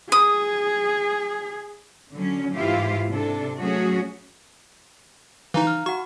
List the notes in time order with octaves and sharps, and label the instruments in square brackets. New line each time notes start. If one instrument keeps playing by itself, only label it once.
[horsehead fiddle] G#4 [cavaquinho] D#6
[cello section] D3 F#3 C#4
G#2 E3 E4 F4 G4 F5
C3 D4 A4
F#3 A3 C#4 F#4 G#4 C#5
[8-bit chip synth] E3 D#4 [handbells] F5 A#5
[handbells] F6
[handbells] F#4 F#5 [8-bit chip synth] C#6